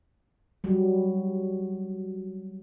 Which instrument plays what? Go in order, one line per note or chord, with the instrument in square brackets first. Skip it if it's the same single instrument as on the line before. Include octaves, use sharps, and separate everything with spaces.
[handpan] F#3 G3